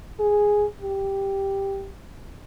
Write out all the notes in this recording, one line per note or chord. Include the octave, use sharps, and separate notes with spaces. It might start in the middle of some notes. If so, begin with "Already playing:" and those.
G#4
G4